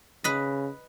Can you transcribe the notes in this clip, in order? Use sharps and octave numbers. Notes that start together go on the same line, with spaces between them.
C#3 B4 D#5